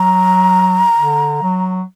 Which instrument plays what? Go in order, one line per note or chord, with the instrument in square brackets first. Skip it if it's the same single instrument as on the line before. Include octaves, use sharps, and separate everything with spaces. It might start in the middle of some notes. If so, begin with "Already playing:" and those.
Already playing: [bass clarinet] F#3 [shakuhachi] A#5
[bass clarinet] D3
F#3